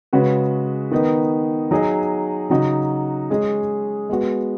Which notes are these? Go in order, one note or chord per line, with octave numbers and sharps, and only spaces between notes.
C#3 G#3 C#4 F#4 B4
D#3 B3 D#4
F#3 D#4 G#4 D#5
C#3 F#3 D#4 F#4
G#3 C#4 G#4 D#5
G#3 B3 F#4